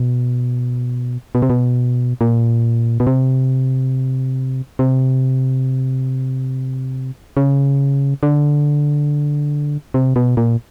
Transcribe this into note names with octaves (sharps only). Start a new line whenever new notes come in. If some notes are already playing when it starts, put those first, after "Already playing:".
Already playing: B2
B2
C3
B2
A#2
B2
C3
C3
C#3
D3
C3
B2
A#2